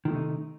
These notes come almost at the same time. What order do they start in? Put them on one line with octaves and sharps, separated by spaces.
D#3 G#3 A3 C3 D#4